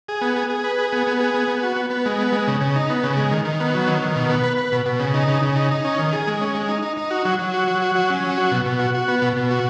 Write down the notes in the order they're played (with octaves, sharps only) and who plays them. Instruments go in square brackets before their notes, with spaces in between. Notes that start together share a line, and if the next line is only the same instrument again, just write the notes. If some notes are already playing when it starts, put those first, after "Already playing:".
[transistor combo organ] G#4
B3
G#4
G#4
B4
G#4
B3
B3
G#4
B3
B3
F#4
B3
B3
G#3
B3
G#3
C#3
C#3
D#4
B3
C#3
G#3
D#3
D#3
B3
F#3
D#3
D#3
B2
B3
B4
B4
B2
B2
C#3
D#4
C#3
C#3
D#4
D#4
C#4
D#3
G#4
G#3
C#4
G#3
D#4
D#4
D#4
F#4
F#3
F#3
F#4
F#3
F#4
F#3
C#4
F#3
F#4
B2
B2
F#4
F#4
B3
B2
B2
F#4